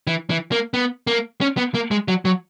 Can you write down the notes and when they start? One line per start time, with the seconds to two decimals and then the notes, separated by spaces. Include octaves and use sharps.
0.07 E3
0.30 E3
0.52 A#3
0.74 B3
1.07 A#3
1.41 C#4
1.57 B3
1.74 A#3
1.91 G#3
2.08 F#3
2.25 F#3